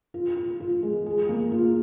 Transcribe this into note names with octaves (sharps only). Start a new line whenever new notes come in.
F4
F4
F4
G#3
G#4
A#3
F4